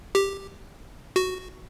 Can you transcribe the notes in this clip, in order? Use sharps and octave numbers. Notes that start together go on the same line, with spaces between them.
G4
F#4